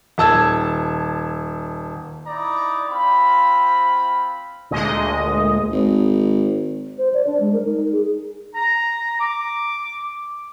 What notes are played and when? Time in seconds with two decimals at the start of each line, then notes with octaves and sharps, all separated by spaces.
0.18 D#1 A5 E6 G#6
2.28 D#4 E4 D5 A#5
2.88 C4 F4 B5
4.71 D2 A#2 G#3 D#5
5.72 G#1
6.98 C5
7.14 D5
7.27 D4
7.40 G#3
7.53 A#4
7.65 D#4
7.92 G#4
8.55 A#5
9.20 D6